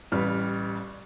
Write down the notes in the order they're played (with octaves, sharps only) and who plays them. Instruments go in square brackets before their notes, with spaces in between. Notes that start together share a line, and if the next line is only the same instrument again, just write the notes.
[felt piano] A1 G3 B4 F6